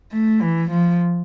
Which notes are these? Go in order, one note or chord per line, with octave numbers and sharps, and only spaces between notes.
A3
E3
F3